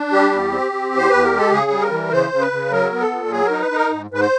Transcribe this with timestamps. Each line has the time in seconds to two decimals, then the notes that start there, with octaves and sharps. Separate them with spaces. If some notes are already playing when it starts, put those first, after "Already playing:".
Already playing: D4
0.12 G3 G4
0.31 E2
0.51 C4
0.72 C4
0.92 E2
0.97 C5
1.10 E2 B4
1.24 A#4
1.31 G#3
1.37 A4
1.51 C#3 G#4
1.71 G3
1.81 A#4
1.91 E3
2.11 C#3 C5
2.31 C#3
2.41 B4
2.52 C#3
2.71 F#3 A#4
2.92 B3
3.00 A4
3.11 A#2
3.31 F#3 G#4
3.45 A#4
3.51 D#4
3.61 B4
3.71 D#4 A#4
3.91 G#2
4.10 G#2 B4
4.20 C5